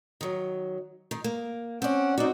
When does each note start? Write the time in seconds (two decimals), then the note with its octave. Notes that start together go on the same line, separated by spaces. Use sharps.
0.21 D#3 F#3
1.11 D#3
1.24 A#3
1.82 C4 C#4 D5 F#5
2.18 C4 D#4 F#4 D5